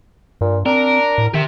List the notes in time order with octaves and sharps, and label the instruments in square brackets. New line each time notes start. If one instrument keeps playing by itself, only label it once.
[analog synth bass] G2 [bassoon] A#2
[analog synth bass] C4 [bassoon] D4 [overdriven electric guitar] A#4
[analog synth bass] A2
[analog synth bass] D#3 [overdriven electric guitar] G4 E5